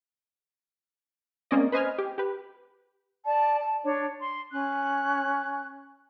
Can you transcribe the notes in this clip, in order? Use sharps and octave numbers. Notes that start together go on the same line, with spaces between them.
G#3 A#3 C4 C#4 D5 D#5
B4 C5 D#5 G#5 F6
G4
G4 B4
D5 A5
A5
D4 C#5
C6
C#4 F#6